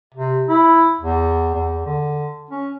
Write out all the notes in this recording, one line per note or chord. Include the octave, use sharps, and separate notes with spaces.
C3
E4
E2
E2
D3
C#4